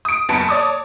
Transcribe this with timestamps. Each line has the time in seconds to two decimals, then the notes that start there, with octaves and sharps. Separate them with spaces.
0.05 D#6 D7
0.29 F#1 F#2 B3 A5 C#7 D7
0.49 C#5 D5 A5 D6 D#6